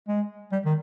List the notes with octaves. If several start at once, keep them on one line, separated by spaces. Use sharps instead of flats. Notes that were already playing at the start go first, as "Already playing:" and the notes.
G#3
G3
D#3